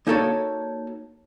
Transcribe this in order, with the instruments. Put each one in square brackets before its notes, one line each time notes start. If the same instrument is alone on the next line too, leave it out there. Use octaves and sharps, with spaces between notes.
[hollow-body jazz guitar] A#3 D#4 F#4 A4 C#5 D5